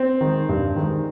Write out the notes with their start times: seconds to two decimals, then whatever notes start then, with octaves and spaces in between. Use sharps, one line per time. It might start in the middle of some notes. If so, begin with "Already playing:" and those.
Already playing: C4
0.21 D#3 G#3
0.49 G2
0.76 D#3 G#3